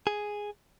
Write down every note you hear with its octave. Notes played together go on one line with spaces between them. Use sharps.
G#4